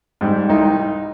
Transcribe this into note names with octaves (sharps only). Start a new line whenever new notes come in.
G#2 G3
C2 D#4